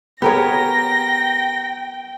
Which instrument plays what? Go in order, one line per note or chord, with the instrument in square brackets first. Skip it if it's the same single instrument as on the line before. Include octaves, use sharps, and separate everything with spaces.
[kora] B3 A#4 C#5 [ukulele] G4 G#4 [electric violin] G5 [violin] A#6